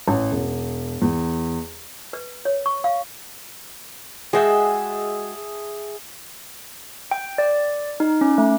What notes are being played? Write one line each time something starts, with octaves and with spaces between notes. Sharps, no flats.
A1
E1
E2
B4
C#5
C#6
F5
G#3 F#4 G#4 E5 G5 A5
G5
D5
D#4
C#4
A3